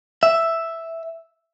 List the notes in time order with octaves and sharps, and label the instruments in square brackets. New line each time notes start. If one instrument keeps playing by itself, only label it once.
[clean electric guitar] E5